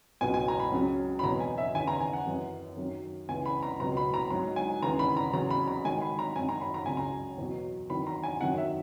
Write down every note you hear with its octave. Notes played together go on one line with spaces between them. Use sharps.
C#2 B2 F#3 G#5
G#5
A#5
B5
C#2 C#3 F#3
B5
E2 B2 F#3 A#5
G#5
E5
D#2 C#3 E3 G#5
A#5
G#5
F#5
F#2 E3
F#2 D#3 F#3
C#2 C#3 E3 G#5
B5
A#5
C#2 B2 F#3 A#5
B5
A#5
G#2 F#3 A#5
G#5
D#2 C#3 E3 A#5
B5
A#5
E2 C#3 F#3 A#5
B5
A#5
G#2 D#3 F#3 G#5
B5
A#5
F#2 D#3 F#3 G#5
A#5
B5
A#5
C#2 C#3 F#3 G#5
A#5
E2 B2 F#3
E2 D#3 F#3 B5
A#5
G#5
F#2 D#3 F#3 F#5
E5